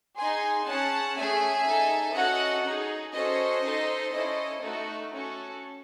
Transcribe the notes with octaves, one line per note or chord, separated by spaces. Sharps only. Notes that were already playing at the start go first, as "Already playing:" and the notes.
D#4 G#4 G#5 C6
C#4 G#4 F#5 A5
A3 C#4 G#4 E5 G#5
D#4 A4
C#4 F#4 A4 D#5 F#5
D#4 G#4
C#4 F#4 A4 C5 D#5
D#4 A4
C#4 E4 A4 C5 D#5
A3 D#4 F#4 A4
C#4 F#4 A4